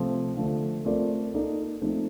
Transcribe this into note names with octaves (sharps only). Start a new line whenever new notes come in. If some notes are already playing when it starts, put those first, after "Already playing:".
Already playing: C3 F3 A3 C4 F4
D3 F3 A3
A3 C4 F4 A#4 D5
A#3 D#4 A4 D5
F3 A3 C4 D#4